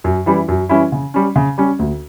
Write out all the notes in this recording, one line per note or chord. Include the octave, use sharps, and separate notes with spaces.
F#2
E3 G3 C#4 E4
F#2
E3 G3 C#4 E4
C#3
G3 C#4
C#3
G3 C#4
D2